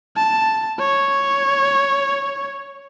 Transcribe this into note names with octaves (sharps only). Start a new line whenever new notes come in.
A5
C#5